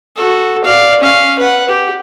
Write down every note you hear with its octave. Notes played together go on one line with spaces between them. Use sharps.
F#4 A4
D5 F5
C#4 F5
B4 F#5
G4